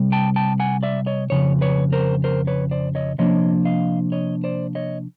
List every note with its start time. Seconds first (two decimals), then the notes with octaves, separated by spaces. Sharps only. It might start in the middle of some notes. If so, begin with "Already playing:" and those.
Already playing: C3 G3
0.12 G5 A5
0.36 G5 A5
0.60 F#5 G#5
0.83 D5 E5
1.06 C#5 D#5
1.30 F2 C#3 C#5
1.61 B4 C#5
1.92 A#4 C5
2.24 A#4 C5
2.47 B4 C#5
2.71 C5 D5
2.95 C#5 D#5
3.18 C3 F3 A#3 D4 C#5 D#5
3.65 D#5 F5
4.12 C#5 D#5
4.44 C5 D5
4.75 C#5 D#5